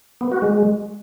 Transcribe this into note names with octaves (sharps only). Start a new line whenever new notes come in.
B3
F#4
G#3